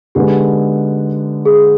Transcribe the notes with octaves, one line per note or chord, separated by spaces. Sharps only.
D3 G#3 B3 D#4 G4
G#4